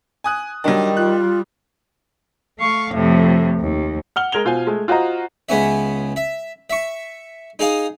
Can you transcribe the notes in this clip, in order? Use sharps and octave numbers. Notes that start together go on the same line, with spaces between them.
G#5 D#6 F#6
D#3 F#3 G3 D4
F4 F#6
A3 F5 C#6
F2 A2 C3 F3
D#2
F#5 F6 G7
G#3 A#4 G#6 F7 G7
B2 F4 C5 G#5
G#3 A3
F4 F#4 C5 D#5 A#5
C#2 B3 C#4 E5
E5
E5 C#6
D#4 G#4 F5 D#6